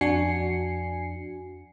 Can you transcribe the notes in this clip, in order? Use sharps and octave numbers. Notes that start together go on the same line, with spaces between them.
F2 D4 F#4 G#5 C7 C#7